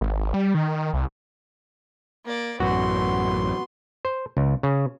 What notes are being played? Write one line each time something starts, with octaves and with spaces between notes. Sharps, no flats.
G#1
G3
D#3
C2
A#3 D5
A1 F#2 B3 F#4 C6
C5
C#2
C#3